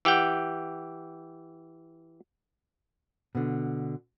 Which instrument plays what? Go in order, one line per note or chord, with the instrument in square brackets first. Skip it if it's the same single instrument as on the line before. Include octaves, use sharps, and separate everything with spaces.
[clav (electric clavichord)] E3 G4 F#5 G5
[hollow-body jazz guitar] B2 D3